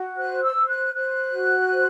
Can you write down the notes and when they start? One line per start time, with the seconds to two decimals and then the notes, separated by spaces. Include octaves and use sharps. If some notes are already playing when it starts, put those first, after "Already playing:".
Already playing: F#4
0.17 C5 F#6
0.43 E6
0.55 C5
0.69 F#6
0.94 C5 F#6
1.33 F#4
1.72 C5